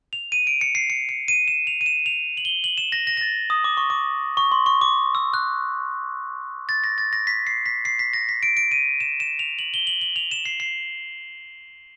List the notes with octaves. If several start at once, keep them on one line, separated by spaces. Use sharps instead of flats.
F7
D#7
D7
C#7
C7
C#7
C#7
D#7
E7
F7
D#7
E7
F7
F#7
G7
F#7
E7
A#6
A#6
A#6
A6
D#6
D6
C#6
D6
C#6
C6
C#6
D6
E6
F#6
A6
A#6
A6
A#6
B6
C7
B6
C7
B6
A#6
B6
D7
D7
D#7
E7
E7
F7
F#7
G7
F#7
F#7
F7
E7
C7
C7